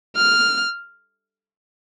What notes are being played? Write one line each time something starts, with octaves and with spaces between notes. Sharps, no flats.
F6